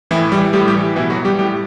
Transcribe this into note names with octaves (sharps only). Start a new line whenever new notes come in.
A2 E3 E4
E3 G3 G4
A2 G3 G4
G3 G4
E3
B2 E3 E4
F#3 F#4
G3 G4
A2 G3 G4